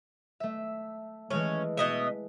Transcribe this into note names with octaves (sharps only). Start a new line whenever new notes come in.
A3 E5
E3 G#3 A3 C#4
B2 D#5 E5